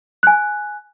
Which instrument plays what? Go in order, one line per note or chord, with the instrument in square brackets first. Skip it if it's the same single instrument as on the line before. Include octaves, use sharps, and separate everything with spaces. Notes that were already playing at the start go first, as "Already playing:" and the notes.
[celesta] G#5 F#6